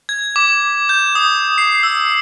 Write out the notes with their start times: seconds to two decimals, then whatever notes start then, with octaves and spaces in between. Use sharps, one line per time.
0.09 G#6
0.36 D6
0.89 G6
1.15 D#6
1.58 C7
1.83 E6